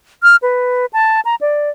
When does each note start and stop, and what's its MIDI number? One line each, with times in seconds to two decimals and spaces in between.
0.23 0.36 89
0.42 0.86 71
0.93 1.21 81
1.25 1.35 82
1.41 1.70 74